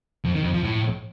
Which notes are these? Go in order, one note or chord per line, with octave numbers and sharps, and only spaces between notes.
F2
D#3
F2
F3
A2